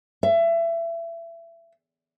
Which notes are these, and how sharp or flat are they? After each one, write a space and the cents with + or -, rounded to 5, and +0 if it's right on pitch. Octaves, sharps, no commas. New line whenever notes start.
E5 +25